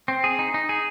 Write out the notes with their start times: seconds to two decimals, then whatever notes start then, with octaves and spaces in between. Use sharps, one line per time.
0.08 C4
0.24 G#4
0.39 D#4
0.54 D#4
0.69 G#4